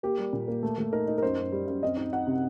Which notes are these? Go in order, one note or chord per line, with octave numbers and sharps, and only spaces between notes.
A#3 G4
G3
A#2
A#3
A3
A3
D#4 A#4
D#4
A#4
F#2 C5
F#2
G3
F#2
C4 D#5
D#4
D#4 F#5
C3